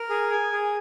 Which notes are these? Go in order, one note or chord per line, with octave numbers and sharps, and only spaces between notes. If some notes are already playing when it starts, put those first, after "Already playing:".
Already playing: A#4
G#4
G#5
G#4